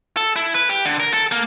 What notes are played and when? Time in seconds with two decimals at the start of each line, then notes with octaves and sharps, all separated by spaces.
0.17 A4
0.36 E4
0.54 B4
0.69 G4
0.85 D3
1.00 A#4
1.13 A4
1.32 A#3